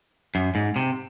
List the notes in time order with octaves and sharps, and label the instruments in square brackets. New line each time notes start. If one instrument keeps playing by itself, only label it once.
[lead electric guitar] F#2
G#2
C3